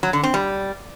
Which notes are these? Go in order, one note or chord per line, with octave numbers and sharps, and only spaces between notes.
F#3
D3
C4
G3